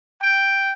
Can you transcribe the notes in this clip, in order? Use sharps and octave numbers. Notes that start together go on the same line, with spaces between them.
G5